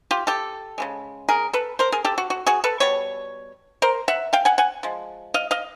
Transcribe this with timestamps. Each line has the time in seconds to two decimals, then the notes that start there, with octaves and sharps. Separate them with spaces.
0.11 F4 G4
0.27 G4 A4
0.78 C#3 E3 G#3
1.29 G#4 A#4
1.53 A4 B4
1.79 A#4 C5
1.92 G#4 A#4
2.05 G4 A4
2.18 F#4
2.30 F#4
2.46 F#4 G#4
2.64 A4 B4
2.80 B2 G3 C#5
3.82 A#4 C5
4.08 E5 F#5
4.33 F5 G5
4.45 F#5 G#5
4.58 F#5 G#5
4.83 F3 G#3
5.34 D#5 F5
5.51 D#5 F5